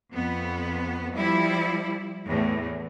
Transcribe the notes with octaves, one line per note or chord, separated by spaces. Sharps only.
F2 B3
F3 G3 E4
E2 A2